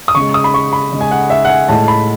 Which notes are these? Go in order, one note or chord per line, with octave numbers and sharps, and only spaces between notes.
D#6
C#3 G#3 C#6
D#6
B5
C#6
B5
C#3 G#3
G#5
F#5
E5
F#5
G#5
A2 G#3 A5
B5